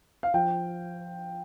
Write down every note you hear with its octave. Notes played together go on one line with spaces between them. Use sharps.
F5
F3 G5